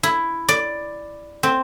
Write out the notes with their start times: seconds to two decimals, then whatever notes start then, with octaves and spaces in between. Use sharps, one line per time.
0.03 E4
0.49 D5
1.43 C4